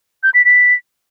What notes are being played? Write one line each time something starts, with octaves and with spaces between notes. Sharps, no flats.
G6
B6
B6